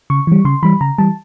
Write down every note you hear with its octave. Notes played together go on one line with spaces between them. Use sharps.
C#3 C#6
E3 G3
C#3 C6
E3 G3 B5
C#3 A#5
E3 G3 A5